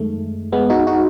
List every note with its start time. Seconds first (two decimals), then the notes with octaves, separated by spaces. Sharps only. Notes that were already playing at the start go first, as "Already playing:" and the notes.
Already playing: F#2 D#3 G#3 A3
0.52 G#3 B3
0.70 D#4 F#4
0.87 D#4 F#4